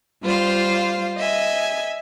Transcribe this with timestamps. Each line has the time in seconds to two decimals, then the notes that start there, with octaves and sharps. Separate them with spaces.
0.23 G3 F4 C5 F5
1.18 D#5 E5 G#5